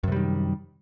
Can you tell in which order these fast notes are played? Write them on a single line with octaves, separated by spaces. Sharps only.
F#2 C3 G3 D#3